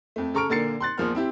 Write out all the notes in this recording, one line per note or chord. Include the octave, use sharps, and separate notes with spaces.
F2 A3
C#3 A4 A#5 C#6 F6 D7
A#2 D3 A#4 A6 C7 C#7
C6 F#6 A6
A#1 E2 F3 A#3 F6
C4 E4 G4